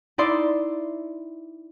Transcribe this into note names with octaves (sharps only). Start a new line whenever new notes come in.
D#4 E4 D5 C6